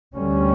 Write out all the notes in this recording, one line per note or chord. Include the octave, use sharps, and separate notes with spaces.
D2 D3 G3 C#4